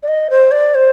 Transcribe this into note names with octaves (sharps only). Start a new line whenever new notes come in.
D5
D#5
C5
D5
C5